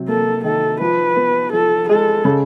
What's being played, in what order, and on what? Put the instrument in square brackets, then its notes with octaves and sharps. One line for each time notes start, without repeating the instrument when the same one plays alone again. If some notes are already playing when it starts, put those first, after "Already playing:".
Already playing: [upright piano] C3 F#3
[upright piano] A#3 [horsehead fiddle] A4
[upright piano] D#3 [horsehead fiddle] A4
[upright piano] F3 [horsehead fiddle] B4
[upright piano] B3
[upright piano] F3 [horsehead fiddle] A4
[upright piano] G#3 [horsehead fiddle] A4
[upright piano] C#3